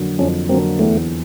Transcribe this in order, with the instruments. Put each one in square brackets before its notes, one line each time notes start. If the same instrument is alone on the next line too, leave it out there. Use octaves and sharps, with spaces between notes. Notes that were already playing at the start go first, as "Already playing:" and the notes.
Already playing: [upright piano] F2 D3 F#3 A#3
[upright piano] F2 [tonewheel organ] C#4
[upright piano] D3 F#3 A#3 [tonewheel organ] C4
[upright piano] E2 [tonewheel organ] A3